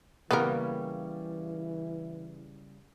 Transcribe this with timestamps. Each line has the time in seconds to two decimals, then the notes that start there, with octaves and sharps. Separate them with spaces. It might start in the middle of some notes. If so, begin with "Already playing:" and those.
0.31 C#3 E3 G3 A#3 B3 A#4